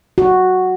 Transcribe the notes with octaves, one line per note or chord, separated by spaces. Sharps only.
F#4